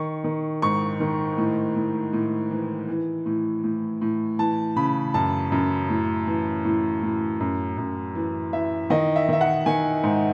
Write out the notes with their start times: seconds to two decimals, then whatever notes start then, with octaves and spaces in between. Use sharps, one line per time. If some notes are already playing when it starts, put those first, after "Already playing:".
Already playing: D#3 C#6
0.24 D#3
0.62 G#2 C#6
1.00 D#3
1.38 A2
1.75 A2
2.13 A2
2.51 E3
2.89 E3
3.26 A2
3.64 A2
4.01 A2
4.39 E3 A5
4.76 C#3 B5
5.14 F#2 A5
5.52 F#2
5.90 A2
6.27 E3
6.65 A2
7.02 A2
7.40 F#2
7.78 F#2
8.15 E3
8.53 E3 E5
8.90 D#3 D#5
9.16 E5
9.29 D#3 E5
9.41 F#5
9.66 D#3 G#5
10.03 G#2